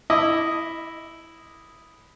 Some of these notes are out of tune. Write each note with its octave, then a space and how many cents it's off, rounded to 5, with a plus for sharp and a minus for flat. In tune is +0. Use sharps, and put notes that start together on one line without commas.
E4 -5 D#5 +0 D6 +0